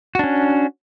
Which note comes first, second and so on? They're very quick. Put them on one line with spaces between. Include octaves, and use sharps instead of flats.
F#4 D4 C#4